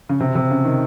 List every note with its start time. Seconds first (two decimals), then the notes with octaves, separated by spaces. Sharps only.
0.09 C#3
0.20 C3
0.35 C3
0.51 C#3
0.65 D#3